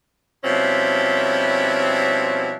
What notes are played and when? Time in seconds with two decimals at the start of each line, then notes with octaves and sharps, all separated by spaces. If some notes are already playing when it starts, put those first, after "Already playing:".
0.44 B2 F3 G3 C4 C#4 E4